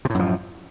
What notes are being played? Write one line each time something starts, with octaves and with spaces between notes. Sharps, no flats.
F#2 A2 C3 F3